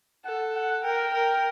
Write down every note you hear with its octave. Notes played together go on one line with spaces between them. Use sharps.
A4 F#5
F#5
A#4 G5
A#4